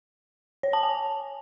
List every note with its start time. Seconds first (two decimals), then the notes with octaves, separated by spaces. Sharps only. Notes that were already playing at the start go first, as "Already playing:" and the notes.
0.63 C#5
0.73 A5
0.83 G#5